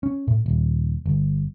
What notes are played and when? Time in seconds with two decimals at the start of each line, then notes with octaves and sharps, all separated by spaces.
0.03 C#4
0.28 A2
0.46 D#1
1.06 G1